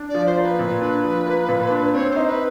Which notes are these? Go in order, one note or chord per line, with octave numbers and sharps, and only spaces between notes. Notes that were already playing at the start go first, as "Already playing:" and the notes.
Already playing: D4
D5
F3
C5
A#3
B4
A#2
D4
F3
A#3
A#2
D4
C4 C#5
C5
D#4
B4